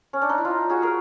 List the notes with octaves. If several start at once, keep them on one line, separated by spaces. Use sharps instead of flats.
C#4
D4
D#4
E4
D#4 F4
F#4 G#4
G#4 A#4